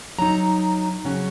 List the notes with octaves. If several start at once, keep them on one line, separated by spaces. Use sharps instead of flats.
F#3 D#4 A#5
C#3 F#3 C#4